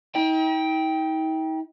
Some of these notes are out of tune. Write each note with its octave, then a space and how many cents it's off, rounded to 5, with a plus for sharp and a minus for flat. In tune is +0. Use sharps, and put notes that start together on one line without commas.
D#4 +45 G5 +0